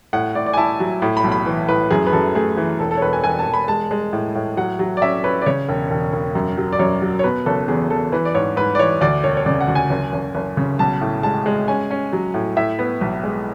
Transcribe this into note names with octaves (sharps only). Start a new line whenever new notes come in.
A2 F#5
A2 D5
D5
G#5
E4 A5
F#3
A2 B5
B5
B1
B5
E3
A2 B4
F#2 G#4
B4
F#2 A4
A3 G#4
E3
E1 A4
A4
C#5
E1 B4
G#5
E1 G#5
A5
E1
B5
G#3 A5
G#3
A2
A2
F#3 F#5
F#3
D5
C#4 E5
C#4 B4
D5
C#3 C#5
E1
E1
E1
F#2
F#3
D5
F#2 C#5
F#3
C#5
B2 B4
F#1 A4
E2 G#4
E2 A4
E3 B4
D5
G#2 C#5
G#2 B4
D5
E3 C#5
D2 D5
E1 C#5
C#5
C#3 D5
F#5
D2
G#5
F#1
F#1
F#1
C#3
B1 A5
A2
G#3 A5
G#3
C#4 G#5
C#4
F#3
A2
A2 E5
B3
B1
G#3